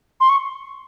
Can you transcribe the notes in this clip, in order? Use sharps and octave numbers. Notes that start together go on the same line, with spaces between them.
C6
C#6